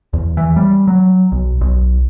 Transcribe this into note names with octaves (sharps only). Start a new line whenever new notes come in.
E2
E3
G3
F#3
B1
B1